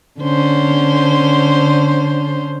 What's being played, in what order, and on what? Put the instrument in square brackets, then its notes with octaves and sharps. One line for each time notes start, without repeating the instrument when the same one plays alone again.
[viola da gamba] D3 C#4 C5